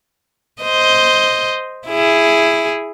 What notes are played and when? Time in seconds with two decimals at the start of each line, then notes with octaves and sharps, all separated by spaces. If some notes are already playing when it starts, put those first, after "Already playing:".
0.62 C5 D#5
1.87 E4 G#4